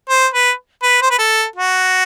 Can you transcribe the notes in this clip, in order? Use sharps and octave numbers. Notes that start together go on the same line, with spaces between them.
C5
B4
B4
C5
B4
A4
F#4